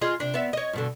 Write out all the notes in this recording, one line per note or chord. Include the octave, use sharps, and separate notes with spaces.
F4 G#4 D#5
C3 D4
B3 D5 E5
C#5 D#5
G2 B2 D3